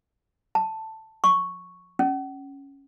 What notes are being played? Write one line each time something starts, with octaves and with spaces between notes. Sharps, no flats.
A5
C#6
C#4